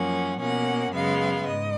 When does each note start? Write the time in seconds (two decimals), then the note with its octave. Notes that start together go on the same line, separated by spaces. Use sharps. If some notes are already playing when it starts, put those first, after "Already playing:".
Already playing: F#2 F3 A#3 C#4 F#5
0.40 B2 A#3 C#4 F#5
0.92 F#2 C#3 G#3 B3 F5
1.47 G#2 D#5